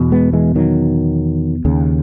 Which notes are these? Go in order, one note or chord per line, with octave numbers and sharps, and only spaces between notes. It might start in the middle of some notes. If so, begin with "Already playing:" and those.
Already playing: E2 B2
G#3 B3
E3 G#3
D#3 F#3
D#2 C#3